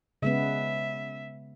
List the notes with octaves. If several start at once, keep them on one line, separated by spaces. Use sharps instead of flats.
C#3 G#3 B3 E5